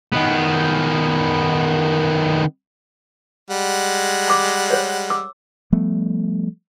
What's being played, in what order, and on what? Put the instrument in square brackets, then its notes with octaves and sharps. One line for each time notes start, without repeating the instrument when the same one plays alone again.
[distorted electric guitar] D#3 B3
[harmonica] G3 G#3 F#5
[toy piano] B5 D6
C5 C#5
D6 E6
[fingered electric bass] F3 G3 A3 B3